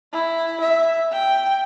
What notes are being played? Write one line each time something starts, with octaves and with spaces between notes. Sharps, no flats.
E4
E5
G5